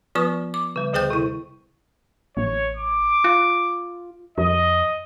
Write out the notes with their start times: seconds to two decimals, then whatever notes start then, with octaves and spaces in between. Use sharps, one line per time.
0.15 F3 B3 F4 B4 C#6 D#6
0.54 D6
0.76 C#3 G3
0.93 D2 D3 G#4 C5 G5 G6
1.10 C3 E4
2.37 A1 C#5
2.77 D6
3.24 F4
4.38 F2 D#5